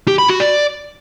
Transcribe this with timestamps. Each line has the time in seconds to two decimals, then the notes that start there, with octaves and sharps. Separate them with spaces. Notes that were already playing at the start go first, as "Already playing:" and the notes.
0.08 G4
0.19 B5
0.29 F#4
0.40 D5